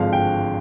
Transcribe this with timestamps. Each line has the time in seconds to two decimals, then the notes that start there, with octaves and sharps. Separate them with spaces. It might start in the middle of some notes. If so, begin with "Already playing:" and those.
Already playing: G#1 G2 D3 F3 G#3 F5
0.13 G5